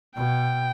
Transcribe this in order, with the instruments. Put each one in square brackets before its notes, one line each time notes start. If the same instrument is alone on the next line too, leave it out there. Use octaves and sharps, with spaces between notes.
[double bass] B2 [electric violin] G5